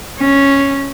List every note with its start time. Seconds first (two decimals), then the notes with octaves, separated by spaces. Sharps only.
0.19 C#4